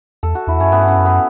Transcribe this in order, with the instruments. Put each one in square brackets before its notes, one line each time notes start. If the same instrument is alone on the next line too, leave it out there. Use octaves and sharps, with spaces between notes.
[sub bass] E2 [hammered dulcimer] A4
[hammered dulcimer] F#4
[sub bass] E2 [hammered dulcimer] E4
[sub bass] F#2 [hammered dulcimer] C#4
[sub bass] G2 [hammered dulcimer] B3
[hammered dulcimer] C#4
[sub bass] F#2
[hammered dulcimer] B3